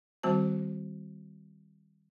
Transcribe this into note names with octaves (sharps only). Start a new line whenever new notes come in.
D#3 G3 C4 F#4 C5 A5